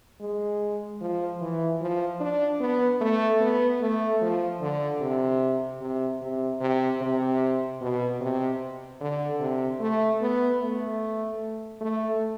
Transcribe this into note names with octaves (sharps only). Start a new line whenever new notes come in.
G#3
F3
E3
F3
D4
B3
A3
B3
A3
F3
D3
C3
C3
C3
C3
C3
B2
C3
D3
C3
A3
B3
A3
A3